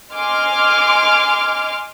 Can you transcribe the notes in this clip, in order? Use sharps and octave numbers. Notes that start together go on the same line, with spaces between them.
D#5 G#5 C6 D6 F6